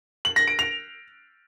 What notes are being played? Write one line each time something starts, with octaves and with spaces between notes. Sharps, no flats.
F#7
A#6
D7
F7